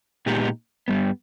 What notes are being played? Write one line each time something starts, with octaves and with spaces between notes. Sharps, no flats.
A#2 G#3 B3 D#4 G4
G2 G3 B3